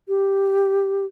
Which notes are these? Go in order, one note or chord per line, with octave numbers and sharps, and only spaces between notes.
G4